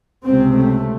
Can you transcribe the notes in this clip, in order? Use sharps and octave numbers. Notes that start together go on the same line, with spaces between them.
C#2 C3 C4
A3